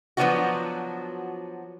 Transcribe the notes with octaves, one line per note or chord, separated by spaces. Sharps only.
F3 F#3 B3 D4 F4 F#4